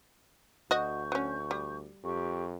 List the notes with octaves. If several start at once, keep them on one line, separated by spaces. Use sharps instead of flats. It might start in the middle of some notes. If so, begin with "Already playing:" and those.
D2 F#4 D#5 C#6 G6
F#3 C#4
G3
F2 G4 C#6